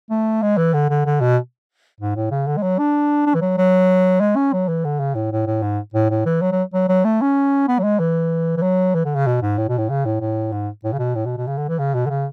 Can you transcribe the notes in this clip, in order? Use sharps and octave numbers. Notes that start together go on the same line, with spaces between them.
A3
G#3
E3
D3
D3
D3
B2
G#2
A2
C#3
D3
G#3
F#3
D4
D4
E3
F#3
F#3
G#3
C#4
F#3
E3
D3
C#3
A2
A2
A2
G#2
A2
A2
E3
F#3
F#3
F#3
F#3
A3
C#4
B3
F#3
G#3
E3
E3
F#3
E3
D3
C#3
B2
G#2
A2
B2
A2
C#3
A2
A2
G#2
A2
C#3
B2
A2
B2
B2
C#3
D3
E3
C#3
B2
D3
C#3